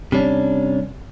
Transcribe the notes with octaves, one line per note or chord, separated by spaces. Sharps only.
C3 G3 C#4 D4